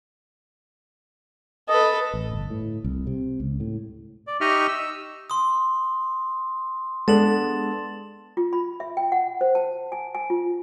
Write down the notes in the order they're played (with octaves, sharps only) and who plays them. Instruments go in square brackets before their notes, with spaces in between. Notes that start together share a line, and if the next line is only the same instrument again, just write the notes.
[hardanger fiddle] A4 B4 [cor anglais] D#5
[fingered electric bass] A1
G1
A2
C2
C3
C#2
A2
[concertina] D5
D#4 G4 D#5 E5 C#6 F6
E6
[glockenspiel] C6 D#6
[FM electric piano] G#3 [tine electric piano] B3 D4 [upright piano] A4 [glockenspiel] A6 E7 F#7
[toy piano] F4
B5
E5
G5
F#5
C5
A5
G#5
G#5
F4